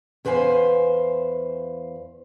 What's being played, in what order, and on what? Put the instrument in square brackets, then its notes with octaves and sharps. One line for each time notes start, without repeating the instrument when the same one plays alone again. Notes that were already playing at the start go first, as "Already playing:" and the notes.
[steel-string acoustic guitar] E2 B4 C5 F5 G#5